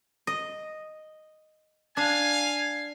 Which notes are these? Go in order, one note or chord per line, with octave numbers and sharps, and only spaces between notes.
D#5
D4 F5 G#5